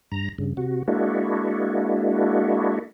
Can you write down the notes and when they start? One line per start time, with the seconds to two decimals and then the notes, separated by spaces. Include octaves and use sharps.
0.12 G2 A#5
0.38 G2 C#3
0.57 C3 F#4
0.88 G#3 A#3 D4 E4 F#4